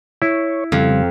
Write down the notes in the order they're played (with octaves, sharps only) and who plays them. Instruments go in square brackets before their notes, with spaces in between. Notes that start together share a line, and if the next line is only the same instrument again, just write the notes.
[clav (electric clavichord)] E4 [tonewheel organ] C#5
[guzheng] F2 [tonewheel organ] C#3 G3